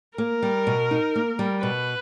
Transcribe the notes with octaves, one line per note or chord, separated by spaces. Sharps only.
A#3 A#4
G3
B2
D#4
A#3
G3
B2 B4